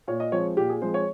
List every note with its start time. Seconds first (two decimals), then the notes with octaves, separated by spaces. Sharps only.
0.08 A#2 C#5
0.20 D#5
0.32 F3 G#3 C4 C#5
0.57 A#2 G4
0.69 G#4
0.82 F3 G#3 C4 C5
0.94 C#5